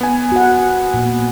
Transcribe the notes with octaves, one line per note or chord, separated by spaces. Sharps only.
B3 G#5
F#4 F#5
A#2